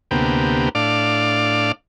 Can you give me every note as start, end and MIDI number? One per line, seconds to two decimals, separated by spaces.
0.11 0.69 38
0.11 0.69 48
0.11 0.69 58
0.11 0.69 59
0.11 0.69 67
0.75 1.72 45
0.75 1.72 62
0.75 1.72 74
0.75 1.72 77